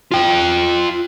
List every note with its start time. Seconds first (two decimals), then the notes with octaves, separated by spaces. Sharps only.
0.12 F4 G5